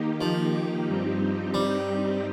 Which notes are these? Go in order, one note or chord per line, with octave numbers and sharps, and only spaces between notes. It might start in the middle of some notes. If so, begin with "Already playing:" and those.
Already playing: D#3 A#3 D#4 G4
F3
G2 G3 C4 D#4 G4
G3